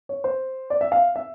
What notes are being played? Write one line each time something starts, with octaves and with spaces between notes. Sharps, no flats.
C#5
C5
D5
E5
F5
E5